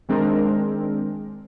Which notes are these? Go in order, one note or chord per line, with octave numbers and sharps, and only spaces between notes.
D#3 G#3 C4 D4 A#4